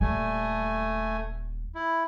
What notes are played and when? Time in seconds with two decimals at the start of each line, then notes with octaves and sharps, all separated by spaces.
0.01 D#1 G3 A3 G#5
1.75 E4